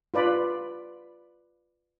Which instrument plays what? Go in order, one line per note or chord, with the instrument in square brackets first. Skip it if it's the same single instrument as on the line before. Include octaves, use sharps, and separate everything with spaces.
[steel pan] F4 B4 D5 B5